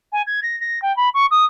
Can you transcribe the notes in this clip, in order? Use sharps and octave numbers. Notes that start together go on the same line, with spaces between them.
G#5
G#6
A#6
A#6
G5
B5
C#6
D#6